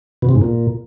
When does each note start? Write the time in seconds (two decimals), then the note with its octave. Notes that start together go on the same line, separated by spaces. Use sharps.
0.22 B2
0.29 C3
0.35 G#2
0.41 A#2